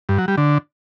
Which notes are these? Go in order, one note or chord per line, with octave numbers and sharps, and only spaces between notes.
G2
F#3
G3
D3